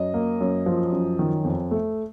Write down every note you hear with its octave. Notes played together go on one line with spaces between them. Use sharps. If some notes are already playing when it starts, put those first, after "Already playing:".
Already playing: F#2 D#5
A#3
F#2
F3
F#2
D#3
F2
A3